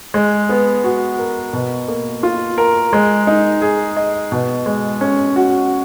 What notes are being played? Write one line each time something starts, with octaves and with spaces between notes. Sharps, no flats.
G#3
B3
F#4
A#4
B2
A#3
F4
A#4
G#3
D#4
G#4
D#5
B2
G#3
C#4
F#4